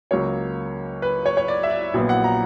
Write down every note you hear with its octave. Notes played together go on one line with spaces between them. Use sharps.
C#2 C#3 F#3 A#3 C#5
B4
C#5
C#5
D5
E5
D5
A#1 A#2 F#3 B3
F#5
A#5